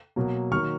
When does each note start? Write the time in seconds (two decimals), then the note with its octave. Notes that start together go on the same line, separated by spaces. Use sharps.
0.16 B2 F#3 A#3
0.51 D#3 F#3 A#3 C#6 F6